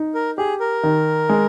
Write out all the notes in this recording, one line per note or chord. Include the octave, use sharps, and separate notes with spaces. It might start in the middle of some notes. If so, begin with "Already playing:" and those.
Already playing: D#4
A#4
G4 G#4
A#4
D#3
G#3